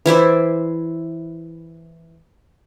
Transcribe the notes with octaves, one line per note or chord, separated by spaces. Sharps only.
E3 E4 C5 D5